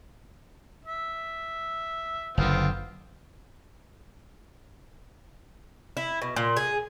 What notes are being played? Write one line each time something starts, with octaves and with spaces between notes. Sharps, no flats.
E5
F#1 D3 B3 C4 F4
E4
B2
A#2
G#4